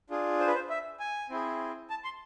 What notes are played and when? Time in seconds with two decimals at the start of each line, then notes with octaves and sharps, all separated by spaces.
0.10 D4 F4 G#4
0.40 C5
0.47 B4
0.55 C5
0.70 E5
1.00 G#5
1.30 C4 E4 G#4
1.90 A5
2.04 C6